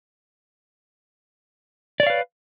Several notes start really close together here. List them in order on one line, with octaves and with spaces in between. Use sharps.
D5 C#5 F5 B4